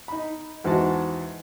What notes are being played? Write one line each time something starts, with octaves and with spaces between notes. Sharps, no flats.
D#4 B5
E2 G#2 D#4 F#4 A5